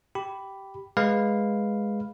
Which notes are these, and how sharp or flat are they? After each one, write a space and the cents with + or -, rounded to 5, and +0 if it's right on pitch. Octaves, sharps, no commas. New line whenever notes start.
G4 -10 B5 +0
G#3 +0 B4 +0 F5 +0